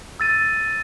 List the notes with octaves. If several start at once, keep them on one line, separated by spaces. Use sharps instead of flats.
E6 A6 D#7